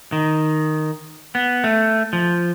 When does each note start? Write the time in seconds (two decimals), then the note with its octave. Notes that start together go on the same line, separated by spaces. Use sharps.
0.12 D#3
1.35 B3
1.64 A3
2.13 F3